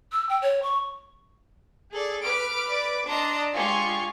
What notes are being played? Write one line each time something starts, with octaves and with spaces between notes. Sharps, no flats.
E6
G5
C#5
C#6
G#4 A4 D5
B4 D6 F6 D7
D5
D4 D#5 A#5 C6
G#3 F4 G4 G#5 C#6